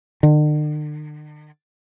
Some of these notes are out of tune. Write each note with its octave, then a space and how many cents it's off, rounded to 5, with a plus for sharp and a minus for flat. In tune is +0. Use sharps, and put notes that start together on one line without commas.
D3 +45